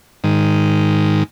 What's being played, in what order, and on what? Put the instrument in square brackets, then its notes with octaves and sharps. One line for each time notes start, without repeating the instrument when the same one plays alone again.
[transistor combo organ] G#2 D#3